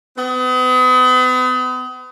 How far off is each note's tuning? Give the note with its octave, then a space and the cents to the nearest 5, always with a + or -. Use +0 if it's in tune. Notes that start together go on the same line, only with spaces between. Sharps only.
B3 +40